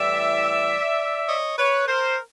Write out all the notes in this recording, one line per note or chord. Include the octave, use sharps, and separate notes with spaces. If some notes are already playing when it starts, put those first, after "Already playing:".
Already playing: A2 E3 G3 D5 E5
C#5 D#5
B4 C#5
A#4 C5